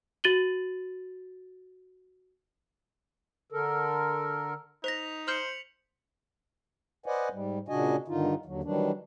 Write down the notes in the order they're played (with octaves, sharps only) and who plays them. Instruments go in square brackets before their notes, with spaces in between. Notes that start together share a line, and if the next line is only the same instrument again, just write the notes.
[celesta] F#4 A6 D#7 F#7 G7
[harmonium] D3 A4 A#4
[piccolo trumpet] D#4 [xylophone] C5 A#6 [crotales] B6 F7
[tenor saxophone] C5 [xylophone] F6 G6 [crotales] C#7 F#7
[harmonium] B4 C5 D5 D#5 F#5 G#5
G#2 G3
A#2 C#3 D4 F#4 D#5 G#5
G2 D3 D#3 D#4 F4
D#2 D3 F#3
D#3 E3 F#3 G3 D4